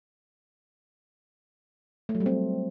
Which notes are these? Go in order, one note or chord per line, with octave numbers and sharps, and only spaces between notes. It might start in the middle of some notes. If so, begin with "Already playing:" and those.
A3
F#3
G3
C4